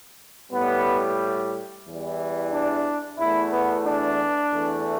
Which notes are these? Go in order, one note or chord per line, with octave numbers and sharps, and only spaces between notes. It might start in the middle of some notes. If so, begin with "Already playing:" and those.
A2 G3 B3
E2 E3 G3
D4
E2 E3 A3 E4
B3
D4
E2 E3 A3